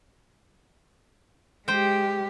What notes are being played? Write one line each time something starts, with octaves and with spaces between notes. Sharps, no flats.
G#3 G4 C5 G5